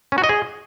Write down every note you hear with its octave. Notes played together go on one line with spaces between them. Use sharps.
C#4
F#4
D#5
G#4